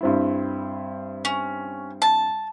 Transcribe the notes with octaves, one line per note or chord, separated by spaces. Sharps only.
G2 C4 E4
C#4
A5